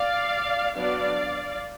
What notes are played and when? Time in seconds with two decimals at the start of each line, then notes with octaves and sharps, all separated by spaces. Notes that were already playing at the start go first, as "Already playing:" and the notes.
Already playing: D5 F5
0.76 F#3 B3 D4 D5 F5